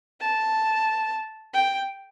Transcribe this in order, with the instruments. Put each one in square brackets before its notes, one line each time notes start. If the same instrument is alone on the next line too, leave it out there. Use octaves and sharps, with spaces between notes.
[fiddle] A5
G5